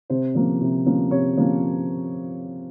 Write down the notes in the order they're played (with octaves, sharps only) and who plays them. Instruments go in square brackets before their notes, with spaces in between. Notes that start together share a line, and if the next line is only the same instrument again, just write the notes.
[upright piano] C3 C5
F3 A#3 C#4
C3
F3 A#3 C#4
C3 C#5
F3 A#3 C#4